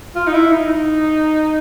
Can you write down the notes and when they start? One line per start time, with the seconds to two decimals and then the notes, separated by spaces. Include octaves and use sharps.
0.15 F4
0.27 D#4
0.34 E4
0.52 D#4